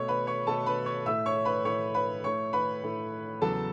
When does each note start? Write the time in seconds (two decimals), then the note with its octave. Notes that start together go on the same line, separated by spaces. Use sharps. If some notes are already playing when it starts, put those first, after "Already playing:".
Already playing: B2 A3 C#5 C#6
0.08 B4 B5
0.27 C#5 C#6
0.47 B2 A3 A4 A5
0.66 B4 B5
0.86 C#5 C#6
1.06 A2 A3 E5 E6
1.26 C#5 C#6
1.45 B4 B5
1.64 A2 A3 C#5 C#6
1.94 B4 B5
2.24 A2 A3 C#5 C#6
2.53 B4 B5
2.83 A2 A3
3.41 E2 C#3 F#3 B3 A4 A5